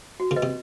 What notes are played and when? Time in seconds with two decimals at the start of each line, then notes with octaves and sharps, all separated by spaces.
0.20 F#4
0.31 C#3
0.36 B4 D#5
0.42 C3